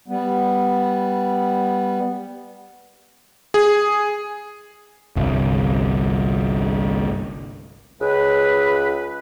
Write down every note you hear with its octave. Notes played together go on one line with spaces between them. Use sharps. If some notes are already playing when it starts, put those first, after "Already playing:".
G3 B3
G#4
G1 C2
C#2 B4